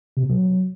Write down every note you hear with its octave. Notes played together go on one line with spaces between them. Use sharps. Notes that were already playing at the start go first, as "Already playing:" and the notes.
C3
B2
F#3